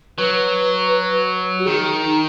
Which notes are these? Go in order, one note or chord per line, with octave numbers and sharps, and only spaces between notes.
F#3 B4
F#4
D#3 G#4
D#4